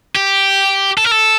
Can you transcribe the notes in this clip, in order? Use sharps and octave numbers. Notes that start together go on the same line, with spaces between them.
G4
A4
A#4
A4